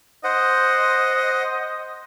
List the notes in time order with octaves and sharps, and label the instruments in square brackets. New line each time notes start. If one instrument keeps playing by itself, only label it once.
[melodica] C5 F#5 [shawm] D#5